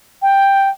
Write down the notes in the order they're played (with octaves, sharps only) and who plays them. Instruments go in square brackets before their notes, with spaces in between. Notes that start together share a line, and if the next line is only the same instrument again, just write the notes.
[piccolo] G5